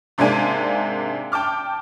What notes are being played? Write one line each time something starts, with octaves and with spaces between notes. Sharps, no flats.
G#2 C3 G#3 A#3 D4 G#5
G5 A5 D6 F6